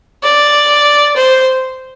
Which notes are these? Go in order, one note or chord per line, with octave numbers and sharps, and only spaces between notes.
D5
C5